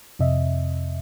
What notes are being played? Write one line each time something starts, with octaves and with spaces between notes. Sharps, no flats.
F2 C3 D#5 E5